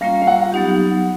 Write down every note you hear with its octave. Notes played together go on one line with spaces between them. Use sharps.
G3 A#3 C#4 F4 F5
F5
F#5
F#3 B3 D#4 G4